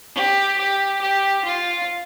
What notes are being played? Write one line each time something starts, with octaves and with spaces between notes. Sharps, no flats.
G4
G4
G4
F4